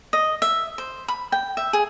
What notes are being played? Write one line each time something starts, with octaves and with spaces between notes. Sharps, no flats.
D#5
E5
C5
B5
G5
E5
G#4